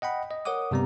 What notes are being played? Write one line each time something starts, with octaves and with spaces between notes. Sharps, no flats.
D#5 F#5 G5 B5
D#5
A#4 C#5 F#5 D6 D#6
G2 C3 G3 B3 A#5